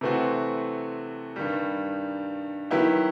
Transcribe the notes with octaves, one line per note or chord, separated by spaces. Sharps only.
C3 E3 A3 C4 F#4
G2 D#3 G3
D#3 F#3 B3 E4 G4